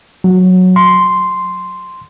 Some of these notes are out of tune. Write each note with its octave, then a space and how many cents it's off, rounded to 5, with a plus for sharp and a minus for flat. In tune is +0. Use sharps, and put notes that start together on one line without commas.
F#3 -10
C6 -5